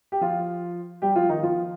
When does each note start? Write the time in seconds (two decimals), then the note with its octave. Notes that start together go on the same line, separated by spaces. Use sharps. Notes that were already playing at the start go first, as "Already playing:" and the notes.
0.12 G4
0.21 F3 F4
1.02 G3 G4
1.16 F3 F4
1.29 D#3 D#4
1.42 F3 F4